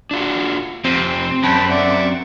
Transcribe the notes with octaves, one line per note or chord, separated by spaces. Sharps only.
D4 F4 F#4
F2 C3 C4
F#2 G5 A5 B5
D5 E5 F#5